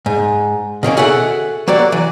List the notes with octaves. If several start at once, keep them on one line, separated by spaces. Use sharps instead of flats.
G#2
B2 D#3 A#3 C#4
F#4 G#4 A4 E5 F#5
F#3 A#3 F#4 G4 D5
E3